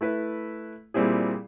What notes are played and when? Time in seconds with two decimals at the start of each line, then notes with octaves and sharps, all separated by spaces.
0.01 A3 E4 B4
0.94 A#2 G3 C4 E4 G#4